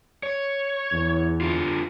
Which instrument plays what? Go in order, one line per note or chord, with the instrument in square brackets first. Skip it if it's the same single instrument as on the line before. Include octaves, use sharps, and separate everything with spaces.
[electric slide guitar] C#5
[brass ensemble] E2
[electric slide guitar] D3 F4